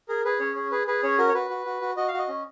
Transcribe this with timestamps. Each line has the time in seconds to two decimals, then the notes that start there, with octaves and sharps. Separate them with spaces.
0.09 G#4 A#4
0.25 G#4 B4
0.40 C#4 C#5
0.56 G#4
0.71 G#4 B4
0.87 G#4 B4
1.03 C#4 C#5
1.18 F#4 A#4
1.29 C#5
1.34 F#4 B4
1.50 F#4
1.66 F#4
1.81 F#4
1.96 F#4 D#5
2.08 F5
2.13 F#4
2.19 D#5
2.28 C#4